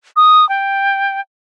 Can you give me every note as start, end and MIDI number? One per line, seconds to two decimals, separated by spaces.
0.16 0.47 87
0.49 1.21 79